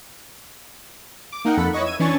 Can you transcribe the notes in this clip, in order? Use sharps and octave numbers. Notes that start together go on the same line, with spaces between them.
D6
A#3 D#4 A#4 F#5 G5
F2 A4 F#5 B5
E4 B4 C#5 D#5 C#6
E6 G#6 D#7
E3 C#4 D4 G#5 C#6 A6